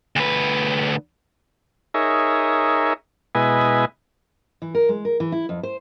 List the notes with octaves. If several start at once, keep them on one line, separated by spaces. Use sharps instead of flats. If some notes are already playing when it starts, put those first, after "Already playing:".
D2 B4
D#4 G#4 A#4 C#5 E5
B2 G#3 E4 B4 D#5 G#5
E3
A#4
G#3
A#4
E3
E4
F2
C5